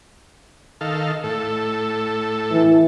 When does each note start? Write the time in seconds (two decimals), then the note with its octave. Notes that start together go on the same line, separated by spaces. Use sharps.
0.81 D#3 A4 F5
1.24 A2 A4
2.50 E3